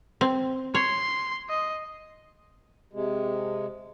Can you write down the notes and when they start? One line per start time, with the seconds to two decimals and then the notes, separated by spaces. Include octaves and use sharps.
0.21 C4
0.74 C#5 C6
1.50 D#5
2.93 C3 G#3